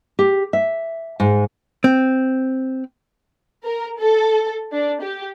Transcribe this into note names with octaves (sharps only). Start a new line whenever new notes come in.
G4
E5
G#2
C4
A#4
A4
D4
G4